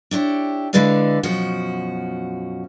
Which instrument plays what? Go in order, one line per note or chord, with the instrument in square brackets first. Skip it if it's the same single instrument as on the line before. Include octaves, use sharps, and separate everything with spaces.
[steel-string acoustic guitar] D4 E4 G4 C#5
D3 G#3 E4 B4 D5 F5
F#2 B2 F3 F#4